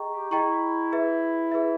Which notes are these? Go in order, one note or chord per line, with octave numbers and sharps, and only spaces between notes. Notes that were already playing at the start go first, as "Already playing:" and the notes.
Already playing: G#4 D#5 G5 A#5 C#6
G4
E4 G#4 D#5 G5 A#5 C#6
G#4 B4 E5
G#4 B4 E5